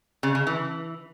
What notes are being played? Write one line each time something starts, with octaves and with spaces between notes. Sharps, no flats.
C#3
C#3
E3